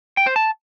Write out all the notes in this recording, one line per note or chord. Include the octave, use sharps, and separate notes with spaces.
G5
C5
A5